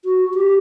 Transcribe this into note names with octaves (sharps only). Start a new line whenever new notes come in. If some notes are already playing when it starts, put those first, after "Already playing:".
F#4
G4